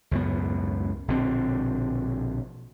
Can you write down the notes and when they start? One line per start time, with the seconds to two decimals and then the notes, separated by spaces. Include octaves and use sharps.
0.11 C#2 F#2 A2 B3
1.08 A#1 B2 D3 C4